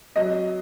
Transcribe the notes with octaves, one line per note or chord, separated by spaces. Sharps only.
F#3 D#5